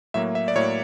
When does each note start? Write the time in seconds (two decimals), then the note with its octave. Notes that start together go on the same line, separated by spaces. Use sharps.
0.14 A2 F#3 A#3 E5
0.35 E5
0.48 D5
0.56 A2 F#3 A#3 C#5